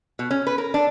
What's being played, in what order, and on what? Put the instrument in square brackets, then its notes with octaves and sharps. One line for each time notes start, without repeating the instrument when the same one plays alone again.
[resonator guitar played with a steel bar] B2
C#4
B4
A#4
D4